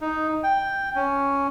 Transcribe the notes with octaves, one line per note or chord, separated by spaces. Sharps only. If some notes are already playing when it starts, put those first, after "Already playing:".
D#4
G5
C#4